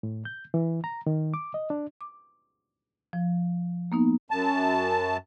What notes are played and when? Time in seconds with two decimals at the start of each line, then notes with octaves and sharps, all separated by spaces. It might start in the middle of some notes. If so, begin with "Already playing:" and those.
0.03 A2
0.25 G6
0.54 E3
0.84 A#5
1.07 D#3
1.34 D6
1.54 D#5
1.70 D4
2.01 D6
3.13 F3
3.92 A#3 B3 D#4
4.31 F#2 A5